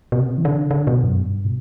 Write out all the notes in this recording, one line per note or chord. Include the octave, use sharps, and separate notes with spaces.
B2
C3
E3
D3
D3
B2
F#2
G2
B2